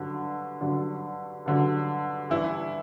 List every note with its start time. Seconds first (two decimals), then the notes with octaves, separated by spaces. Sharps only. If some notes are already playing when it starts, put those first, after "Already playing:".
Already playing: G2 D3 F#3
0.60 G2 D3 F#3
1.46 G2 D3 F#3
2.30 G2 E3 E4